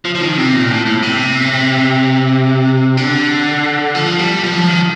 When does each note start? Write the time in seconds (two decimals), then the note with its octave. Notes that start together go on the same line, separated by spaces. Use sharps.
0.05 F3
0.15 F3
0.21 D#3
0.37 C3
0.54 A#2
0.70 A2
0.86 A2
1.02 C3
2.97 D3
3.95 F3
4.19 G3
4.44 F3
4.52 G3
4.56 F3
4.68 D#3